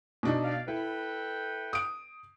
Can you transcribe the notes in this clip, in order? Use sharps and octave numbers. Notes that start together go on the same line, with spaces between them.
B2 D4 D#4
D5 F5
E4 A4 B4 G5
D#6 D7